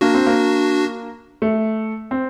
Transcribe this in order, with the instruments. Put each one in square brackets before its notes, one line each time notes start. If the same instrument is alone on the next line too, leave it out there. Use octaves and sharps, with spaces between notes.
[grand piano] A#3 [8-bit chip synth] D4 F#4
[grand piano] C4
A#3
A3
C4